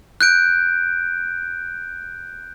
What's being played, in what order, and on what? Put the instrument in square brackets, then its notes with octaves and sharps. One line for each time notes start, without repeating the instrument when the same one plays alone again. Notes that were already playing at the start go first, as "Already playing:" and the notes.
[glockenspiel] F#6 G6 D7